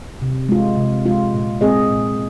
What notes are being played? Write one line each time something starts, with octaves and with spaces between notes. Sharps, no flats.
C3
G#3 F4
C3
G#3 F4
A#2
G#3 C4 G#4 D#5
A#2